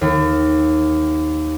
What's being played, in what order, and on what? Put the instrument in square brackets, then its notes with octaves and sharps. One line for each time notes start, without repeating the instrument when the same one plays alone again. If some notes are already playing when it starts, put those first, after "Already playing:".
[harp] D#2